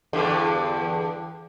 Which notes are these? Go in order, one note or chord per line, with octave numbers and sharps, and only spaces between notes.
E2 G2 D3